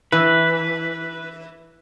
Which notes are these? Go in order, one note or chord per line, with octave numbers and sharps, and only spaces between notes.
E3 B4